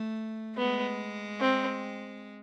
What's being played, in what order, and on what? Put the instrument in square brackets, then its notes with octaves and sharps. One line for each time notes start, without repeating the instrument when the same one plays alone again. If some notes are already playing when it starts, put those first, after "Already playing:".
Already playing: [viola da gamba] A3
[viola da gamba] G#3 [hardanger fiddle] B3
[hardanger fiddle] C4